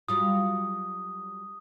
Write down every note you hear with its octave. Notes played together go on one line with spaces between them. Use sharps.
F#3 G3 F4 D#6